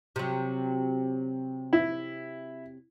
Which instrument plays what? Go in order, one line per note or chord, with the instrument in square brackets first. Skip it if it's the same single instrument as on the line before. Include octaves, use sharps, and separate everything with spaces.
[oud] C3 F#3
[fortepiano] E4